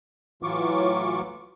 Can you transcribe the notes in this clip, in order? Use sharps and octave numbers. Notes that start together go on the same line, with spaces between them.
A2 E3 F#3 F4 C#6 D6